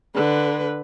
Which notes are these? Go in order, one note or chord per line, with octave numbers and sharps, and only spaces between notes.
D3 B4